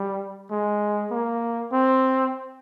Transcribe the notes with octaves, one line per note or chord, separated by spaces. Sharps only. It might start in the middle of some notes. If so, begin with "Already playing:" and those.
Already playing: G3
G#3
A#3
C4